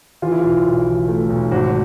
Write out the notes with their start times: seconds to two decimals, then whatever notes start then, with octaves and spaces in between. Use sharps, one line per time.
0.22 E3 F4
0.32 E4
0.40 B1 F4
0.65 B1
0.87 E3
1.08 A3
1.29 B1
1.51 G#1 F#4